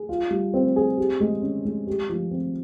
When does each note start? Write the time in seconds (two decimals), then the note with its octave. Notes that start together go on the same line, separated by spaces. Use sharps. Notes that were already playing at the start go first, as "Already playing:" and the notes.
Already playing: G#4
0.09 F4
0.31 G3
0.54 C4
0.76 G#4
0.98 G4
1.20 G#3
1.42 C#4
1.65 G#3
1.87 G4
2.09 F3
2.31 C4